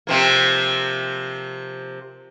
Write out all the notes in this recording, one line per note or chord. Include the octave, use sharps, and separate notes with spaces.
C3 F3 A#3